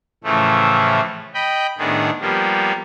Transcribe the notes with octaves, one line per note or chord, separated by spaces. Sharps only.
A2 C#3 E3 F3 A3
D#5 G5 B5
A2 D#3 B3 D4 G#4
F3 G3 A#3 B3